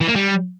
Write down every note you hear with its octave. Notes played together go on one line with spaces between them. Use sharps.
E3
A#3
G3